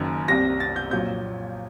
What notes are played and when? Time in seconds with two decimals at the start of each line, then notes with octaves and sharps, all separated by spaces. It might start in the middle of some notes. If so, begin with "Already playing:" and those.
Already playing: F#1 F#2 D#3
0.28 C2 C3 G3 A#6
0.60 A6
0.76 G6
0.91 A#1 A#2 F#3 G6